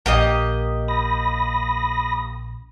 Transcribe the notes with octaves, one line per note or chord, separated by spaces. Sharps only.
A#1 A#3 G4 D#5
B5 D#6 A#6